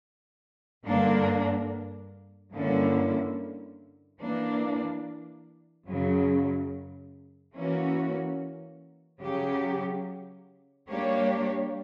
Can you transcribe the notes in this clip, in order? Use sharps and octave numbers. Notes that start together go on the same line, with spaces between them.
G2 D3 A#3 D4
G2 D3 A#3 C#4 E4
E3 A#3 D4
F#2 C#3 F#3
E3 A#3 C#4 F#4
C#3 F#3 C#4 G4
G3 A#3 D4 G4 C#5